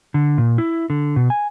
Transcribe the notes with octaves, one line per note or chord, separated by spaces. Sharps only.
D3
A#2
E4
D3
B2
G#5